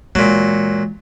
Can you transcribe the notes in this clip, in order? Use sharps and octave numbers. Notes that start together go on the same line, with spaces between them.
A#2 E3 F#3 G#3